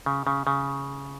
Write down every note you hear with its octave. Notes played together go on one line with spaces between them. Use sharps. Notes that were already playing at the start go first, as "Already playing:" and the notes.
C#3
C#3
C#3